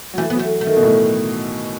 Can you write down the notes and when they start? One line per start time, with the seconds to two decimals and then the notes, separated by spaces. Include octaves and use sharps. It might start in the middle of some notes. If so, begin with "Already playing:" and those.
0.14 F#3
0.18 E3 A3
0.30 F#3 B3
0.39 A3
0.61 A3
0.67 D#3
0.76 B2
0.83 A2